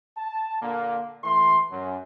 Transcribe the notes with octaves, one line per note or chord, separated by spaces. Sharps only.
A5
A#2 D3 A#3
E3 A3 C6
F#2